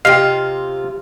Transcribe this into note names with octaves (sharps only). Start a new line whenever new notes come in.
C3 F4 D#5 F5 G5